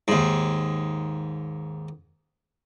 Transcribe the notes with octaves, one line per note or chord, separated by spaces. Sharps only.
D#2 G#2